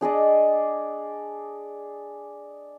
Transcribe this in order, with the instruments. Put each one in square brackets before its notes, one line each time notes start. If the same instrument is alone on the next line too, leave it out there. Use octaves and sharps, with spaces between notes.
[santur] D4 G#4 D5 D#5